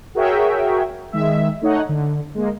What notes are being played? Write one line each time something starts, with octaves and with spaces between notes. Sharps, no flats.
F#4 G#4 A#4 C#5 E5 G5
D#3 G#3 E5
A3 D#4 C#5 D#5 F#5
D3
G#3 A#3